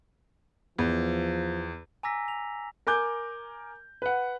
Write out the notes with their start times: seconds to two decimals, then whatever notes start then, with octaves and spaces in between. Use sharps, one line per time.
0.79 E2 F3
2.03 G#5 A#5 D6 E6 A#6 B6
2.28 F7
2.87 A#4 G#5 D6 G6
4.02 B4 F#5